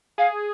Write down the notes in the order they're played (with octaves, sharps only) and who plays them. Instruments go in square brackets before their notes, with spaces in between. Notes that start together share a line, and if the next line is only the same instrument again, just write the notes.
[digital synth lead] G#4 [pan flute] F5